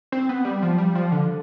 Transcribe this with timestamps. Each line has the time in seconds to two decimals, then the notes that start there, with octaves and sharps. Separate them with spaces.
0.12 C4
0.29 B3
0.45 G3
0.62 F3
0.78 G3
0.95 F3
1.12 D3